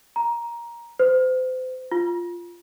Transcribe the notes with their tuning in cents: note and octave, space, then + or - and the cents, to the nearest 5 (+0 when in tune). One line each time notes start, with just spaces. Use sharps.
A#5 +10
C5 -35
F4 -5